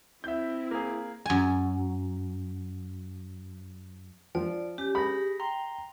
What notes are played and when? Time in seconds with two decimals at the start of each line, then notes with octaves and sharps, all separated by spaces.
0.24 C4 E4 E5 G6
0.71 A#3 G#4
1.26 F#2 G#5
4.35 F3 D5
4.78 C#4 G4
4.95 G#4 B5 A#6
5.40 G5 A#5 C6